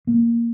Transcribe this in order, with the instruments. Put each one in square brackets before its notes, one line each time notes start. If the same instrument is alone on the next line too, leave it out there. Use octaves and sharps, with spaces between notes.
[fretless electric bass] A#3